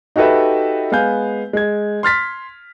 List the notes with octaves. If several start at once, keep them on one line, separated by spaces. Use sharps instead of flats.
D#4 F#4 G4 A4 B4 E5
G#3 B3 F5 G#5 G6
G#3 G#6
C6 F6 A6 B6